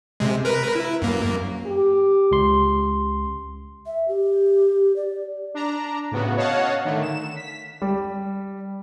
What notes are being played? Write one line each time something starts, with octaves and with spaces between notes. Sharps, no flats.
C3 G#3
A#4 B4
E4
F#2 A#3
G4
C#2 C6
E5
G4
D5
D4 A#5
A2 C#3 B3 F#4
C#5 D#5 F5 F#5 A5
D3 D#3 A3
E7
B6
G3